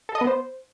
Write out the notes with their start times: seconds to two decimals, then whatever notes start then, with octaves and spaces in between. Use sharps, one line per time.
0.09 A4
0.15 D#5
0.21 B3
0.27 C5